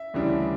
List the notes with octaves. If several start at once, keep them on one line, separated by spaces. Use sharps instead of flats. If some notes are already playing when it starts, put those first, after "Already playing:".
Already playing: E5
D2 C#3 E3 G3 D4